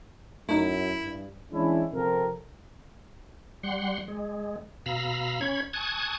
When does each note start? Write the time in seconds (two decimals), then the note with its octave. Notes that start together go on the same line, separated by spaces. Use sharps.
0.49 F#2 A3 D#4 E4
1.03 G2
1.51 E3 G#3 C#4 D4 E4
1.93 C3 F3 C4 A4 A#4
3.63 G3 F#5 C6
4.08 G#3
4.86 B2 F5 A#5 B5 E6
5.41 C#4 C#5 B5 G#6
5.73 G#5 A5 C#6 D#6 F#6 G#6